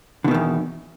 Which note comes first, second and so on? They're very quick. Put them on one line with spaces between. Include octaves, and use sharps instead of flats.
D3 B2 D#3 E2